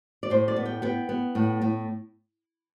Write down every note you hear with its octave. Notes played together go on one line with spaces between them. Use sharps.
D5
A2 C5
D5
B3
G5
B3 G5
B3
A2
A2